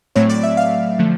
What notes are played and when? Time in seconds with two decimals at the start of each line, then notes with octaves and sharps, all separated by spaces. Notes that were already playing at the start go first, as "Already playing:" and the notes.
0.16 A2 F#3 A3 C4 C#5
0.29 D5
0.43 E5
0.57 F5
0.99 D3 F3 A3